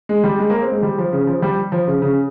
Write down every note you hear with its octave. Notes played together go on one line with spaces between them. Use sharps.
G#3
G3
G#3
A#3
C4
G#3
G3
F3
C#3
F3
G3
F3
C#3
C#3